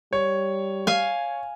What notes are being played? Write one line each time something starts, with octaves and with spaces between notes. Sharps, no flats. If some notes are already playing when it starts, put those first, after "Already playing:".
G3 C#5
F5 G#5